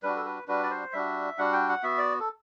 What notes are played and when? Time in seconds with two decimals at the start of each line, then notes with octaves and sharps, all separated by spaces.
0.03 G3 D4 F#4 B4
0.16 A4
0.25 B4
0.48 G3 D4 F#4 B4
0.63 D5
0.70 C5
0.93 G3 D4 F#4 E5
1.38 G3 D4 F#4 F#5
1.53 G5
1.69 F#5
1.83 B3 F#4 E5
1.98 D5
2.20 A4